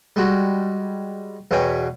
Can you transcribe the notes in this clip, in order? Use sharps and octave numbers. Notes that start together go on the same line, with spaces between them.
G3 G#3 F#4
E2 B2 C#4 G5 G#5